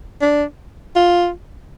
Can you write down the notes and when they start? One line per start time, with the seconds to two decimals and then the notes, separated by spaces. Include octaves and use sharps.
0.21 D4
0.96 F4